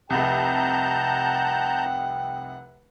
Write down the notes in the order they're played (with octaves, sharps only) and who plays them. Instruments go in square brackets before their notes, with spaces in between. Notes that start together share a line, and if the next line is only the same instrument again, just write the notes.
[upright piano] F1 C2 [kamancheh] F#5 [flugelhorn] G5 [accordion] A5 A#5 G6